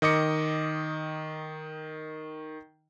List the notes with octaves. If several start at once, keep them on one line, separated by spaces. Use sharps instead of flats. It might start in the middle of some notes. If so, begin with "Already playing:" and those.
D#3 D#5 D6 C#7